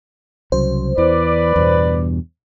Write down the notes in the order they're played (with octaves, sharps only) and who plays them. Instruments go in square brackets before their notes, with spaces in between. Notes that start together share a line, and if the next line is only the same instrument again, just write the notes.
[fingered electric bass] C2 C#3 F#3 [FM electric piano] C5
[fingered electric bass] E2 E3 [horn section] B4 D5
[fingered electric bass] E2 G2 B2